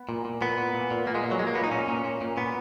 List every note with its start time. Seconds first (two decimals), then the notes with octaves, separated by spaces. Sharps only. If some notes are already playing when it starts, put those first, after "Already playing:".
Already playing: B3
0.09 A#2
0.25 A#2
0.41 A#2 B3
0.58 A#2
0.74 A#2
0.91 A#2
1.06 A#2 A#3
1.15 G#3
1.24 A#2
1.31 F#3
1.39 A#2 G#3
1.47 A#3
1.55 A#2 B3
1.64 D#4
1.71 A#2 C#4
1.88 A#2
2.04 A#2
2.21 A#2
2.37 A#2 B3